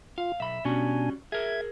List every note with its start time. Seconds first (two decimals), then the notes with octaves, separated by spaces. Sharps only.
0.18 F4 F5
0.40 B1 E5 B5 E6
0.65 B2 G3 C#4 D4 F#4 G#5
1.32 G#4 A#4 E5 G#6